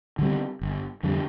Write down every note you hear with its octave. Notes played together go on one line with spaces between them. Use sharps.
D3 G3 C4
G1
F2 D3 G3